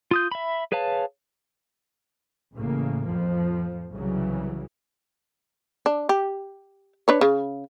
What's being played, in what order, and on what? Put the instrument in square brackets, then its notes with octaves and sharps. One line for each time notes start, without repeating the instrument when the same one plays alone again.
[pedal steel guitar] F4 D#6 G6
E5 B5
G#4 B4 C#5 F5 A5
[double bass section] A1 A2 C#3 A#3
F2 F3
C2 C#3 E3 F#3
[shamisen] D4
G4
D4 B4 C#5
C#3